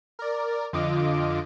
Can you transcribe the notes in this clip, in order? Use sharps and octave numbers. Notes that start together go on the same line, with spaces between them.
A#4 D5
F2 D3 F4 D#5 D6 D7